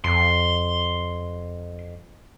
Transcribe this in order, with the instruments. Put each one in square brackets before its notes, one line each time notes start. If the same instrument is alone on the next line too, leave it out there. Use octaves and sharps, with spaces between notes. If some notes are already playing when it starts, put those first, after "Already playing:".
[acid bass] F2 [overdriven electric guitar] C6